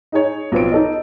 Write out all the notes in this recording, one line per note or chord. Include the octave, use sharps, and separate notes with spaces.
D#4 G#4 C#5
B1 F3 B3 C4 D7
D#4 A4 C#5 D#5